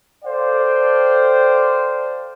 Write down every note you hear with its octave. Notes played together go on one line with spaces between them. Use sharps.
A4 C5 D5 F5 G5